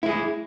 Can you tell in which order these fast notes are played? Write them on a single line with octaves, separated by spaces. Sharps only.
E4 G#3 G#4